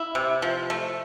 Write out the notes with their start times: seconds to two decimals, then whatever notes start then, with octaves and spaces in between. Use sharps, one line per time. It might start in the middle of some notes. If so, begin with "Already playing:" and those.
Already playing: E4
0.15 C3
0.42 F3
0.70 A3